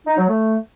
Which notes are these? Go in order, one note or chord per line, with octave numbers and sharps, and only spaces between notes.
D#4
F#3
A3